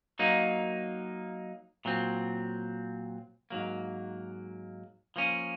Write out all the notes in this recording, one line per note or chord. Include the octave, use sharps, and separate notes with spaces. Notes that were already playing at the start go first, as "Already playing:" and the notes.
F#3 A#3 D#4
A#2 F#3 C4
G#2 F#3 A#3
F3 A#3 C#4